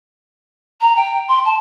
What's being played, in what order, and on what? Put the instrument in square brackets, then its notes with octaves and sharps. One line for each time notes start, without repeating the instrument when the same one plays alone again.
[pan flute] A#5
G5
C6
A5